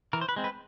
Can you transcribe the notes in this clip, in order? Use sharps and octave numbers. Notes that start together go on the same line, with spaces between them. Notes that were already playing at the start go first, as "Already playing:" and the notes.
E3 A#4
C5
B4
G#3 C4
B4